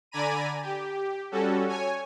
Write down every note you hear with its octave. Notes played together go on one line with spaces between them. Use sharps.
D3 D5 G#5 A#5 B5 D#7
G4
G3 C#4 F#4 A4
C#5 G#5